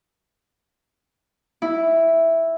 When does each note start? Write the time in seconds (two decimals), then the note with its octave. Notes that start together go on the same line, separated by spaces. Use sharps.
1.62 E4